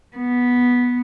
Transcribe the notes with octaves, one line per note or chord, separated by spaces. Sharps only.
B3